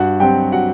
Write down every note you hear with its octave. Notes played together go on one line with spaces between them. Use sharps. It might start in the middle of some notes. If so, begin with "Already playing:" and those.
Already playing: G2 F#4 F#5
F#3 C4 G4 G5
F#4 F#5